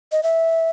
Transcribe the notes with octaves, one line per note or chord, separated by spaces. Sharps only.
D#5
E5